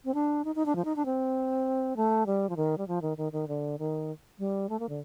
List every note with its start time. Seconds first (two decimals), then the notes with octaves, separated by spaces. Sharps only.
0.05 C4
0.14 D4
0.45 D#4
0.55 D#4
0.66 D4
0.76 F3
0.85 D#4
0.96 D4
1.05 C4
1.96 A3
2.26 G3
2.49 F3
2.57 D#3
2.78 G3
2.88 F3
3.02 D#3
3.17 D#3
3.32 D#3
3.48 D3
3.79 D#3
4.39 G3
4.69 A3
4.79 A#3
4.89 D3